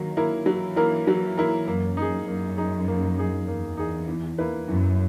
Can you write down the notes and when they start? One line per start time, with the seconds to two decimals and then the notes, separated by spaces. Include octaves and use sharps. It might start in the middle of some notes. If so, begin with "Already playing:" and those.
Already playing: D#3 F#3 A#3
0.17 A#3 E4 A#4
0.46 E3 F#3
0.76 A#3 E4 A#4
1.07 F#3
1.37 A#3 E4 A#4
1.66 F#2 A#3
1.97 D#4 G#4
2.28 F#2 A#3
2.57 D#4 G#4
2.88 A#3
3.18 D#4 G#4
3.47 E2 A#3
3.77 D#4 G#4
4.08 E3
4.38 A#3 E4 B4
4.68 F#2 E3